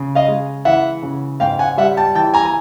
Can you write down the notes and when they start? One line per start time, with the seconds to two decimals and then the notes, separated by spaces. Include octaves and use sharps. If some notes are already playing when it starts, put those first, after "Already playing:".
Already playing: C#3
0.15 D#5 F5
0.28 G#3
0.65 E3 E5 F#5
1.03 C#3
1.40 G#2 F5 G5
1.59 F#5 G#5
1.77 G3 E5 F#5
1.97 G5 A5
2.15 E3 G5 A5
2.34 G#5 A#5
2.45 G#5